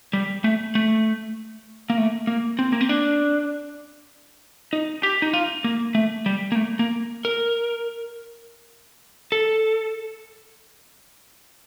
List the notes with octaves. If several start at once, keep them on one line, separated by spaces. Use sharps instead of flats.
G3
A3
A3
A#3
A3
A#3
C4
A#3
C4
D4
D#4
G4
D#4
F4
A#3
A3
G3
A#3
A3
A#3
A#4
A4